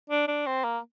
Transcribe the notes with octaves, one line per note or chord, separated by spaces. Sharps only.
D4
D4
C4
A#3